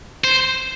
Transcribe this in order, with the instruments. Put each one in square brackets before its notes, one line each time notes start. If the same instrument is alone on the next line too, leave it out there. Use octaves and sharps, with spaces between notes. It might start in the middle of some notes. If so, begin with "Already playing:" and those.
[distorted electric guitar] C5